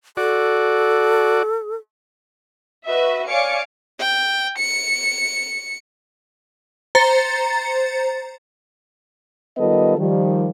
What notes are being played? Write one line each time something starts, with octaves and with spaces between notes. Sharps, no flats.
F#4 A4 D5
F#4 B4 D#5 E5
C#5 D5 F5 G#5 D6 C#7
G5
C#7
C5 A#5 A6 C#7
D#3 G3 B3 F4 A4 D#5
D#3 F3 G3